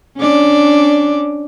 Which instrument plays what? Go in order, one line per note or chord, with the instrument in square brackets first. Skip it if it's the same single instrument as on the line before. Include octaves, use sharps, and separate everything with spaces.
[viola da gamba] C#4 D4 D5